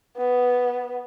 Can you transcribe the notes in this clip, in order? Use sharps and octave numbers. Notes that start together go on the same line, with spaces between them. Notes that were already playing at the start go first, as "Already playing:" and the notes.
B3